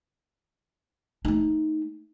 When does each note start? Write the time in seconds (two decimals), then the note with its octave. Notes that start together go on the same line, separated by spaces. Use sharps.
1.25 A3 D#4